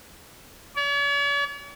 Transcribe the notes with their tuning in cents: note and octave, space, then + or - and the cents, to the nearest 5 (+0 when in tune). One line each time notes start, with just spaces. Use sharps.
C#5 +45